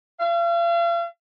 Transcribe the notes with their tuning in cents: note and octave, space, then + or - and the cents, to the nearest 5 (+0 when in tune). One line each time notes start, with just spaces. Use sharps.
F5 -40